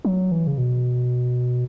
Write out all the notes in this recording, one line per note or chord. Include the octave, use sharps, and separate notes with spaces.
F#3
E3
C#3
B2